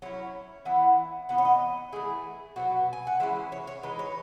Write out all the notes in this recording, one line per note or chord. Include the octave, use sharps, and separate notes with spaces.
F#3 C#4 E4 C#5
E3 B3 E4 F#5
E3 B3 D#4 F#5
C#5
D#5
E3 A3 E4 G#4
B2 F#3 B3 F#4
G#5
F#5
E3 G#3 C#4 E4 E5
C#5
C#5
E3 G#3 D#4 B4
C#5